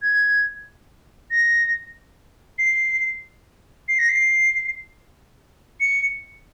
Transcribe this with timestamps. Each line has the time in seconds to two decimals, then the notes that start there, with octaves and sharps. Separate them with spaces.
0.02 G#6
1.31 A#6
2.59 C7
3.89 C7
3.99 A#6
4.09 C7
5.81 C#7